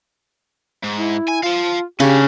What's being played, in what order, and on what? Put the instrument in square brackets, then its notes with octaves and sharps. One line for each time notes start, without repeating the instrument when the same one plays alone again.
[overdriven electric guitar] G#2
[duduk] E4
[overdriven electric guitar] G#5
[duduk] F4 [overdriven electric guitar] F5 A5
[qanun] C#3 [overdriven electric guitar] C#4 D4 [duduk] G4